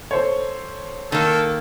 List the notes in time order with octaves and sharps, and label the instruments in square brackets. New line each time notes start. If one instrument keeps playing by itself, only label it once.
[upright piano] A4 C5 C#5
[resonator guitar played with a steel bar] D#3 A#3 [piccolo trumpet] A4